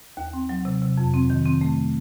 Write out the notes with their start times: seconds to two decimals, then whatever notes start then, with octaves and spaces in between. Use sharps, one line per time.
0.17 D#2
0.33 C4
0.49 F#3
0.65 C3
0.82 C3
0.97 F2
1.14 C4
1.30 D#3
1.45 C4
1.61 A3